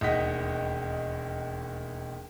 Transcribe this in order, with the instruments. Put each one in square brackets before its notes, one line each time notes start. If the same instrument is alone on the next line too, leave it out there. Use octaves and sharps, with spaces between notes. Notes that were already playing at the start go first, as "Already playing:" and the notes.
[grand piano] E1 D#2 D#4 D#5 F#5 B6